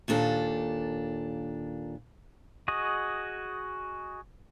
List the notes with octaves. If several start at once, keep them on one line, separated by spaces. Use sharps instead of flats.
D#2 A#2 D4 A4
F#4 G#4 D#5